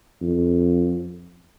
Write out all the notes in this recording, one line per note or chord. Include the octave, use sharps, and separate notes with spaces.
F2